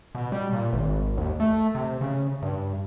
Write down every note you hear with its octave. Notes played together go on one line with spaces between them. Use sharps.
B2
G3
A#2
G#1
D#2
A3
C3
C#3
G2